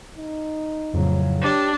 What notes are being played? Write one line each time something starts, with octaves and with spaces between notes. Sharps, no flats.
D#4
F2 A2 C#3 F#3
D4 G4 C#5